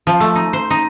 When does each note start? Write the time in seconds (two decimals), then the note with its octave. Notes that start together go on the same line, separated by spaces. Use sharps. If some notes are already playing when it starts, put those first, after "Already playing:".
0.07 F3
0.20 A3
0.35 D#4
0.53 C5
0.70 D#4